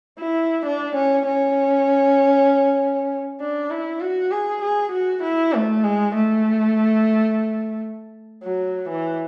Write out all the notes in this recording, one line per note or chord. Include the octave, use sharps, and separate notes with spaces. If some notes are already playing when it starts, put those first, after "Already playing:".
E4
D4
C#4
C#4
D4
E4
F#4
G#4
G#4
F#4
E4
A3
G#3
A3
F#3
E3